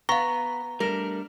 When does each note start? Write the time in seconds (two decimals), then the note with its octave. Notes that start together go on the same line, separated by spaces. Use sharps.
0.09 B3 F5 A#5 C#6
0.80 G3 A3 D4 A#4